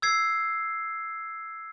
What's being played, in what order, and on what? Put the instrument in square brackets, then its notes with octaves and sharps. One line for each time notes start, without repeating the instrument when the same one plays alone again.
[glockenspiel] E6 G#6 C7